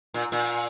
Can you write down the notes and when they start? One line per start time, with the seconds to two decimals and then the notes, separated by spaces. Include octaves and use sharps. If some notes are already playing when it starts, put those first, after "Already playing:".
0.14 A#2
0.32 A#2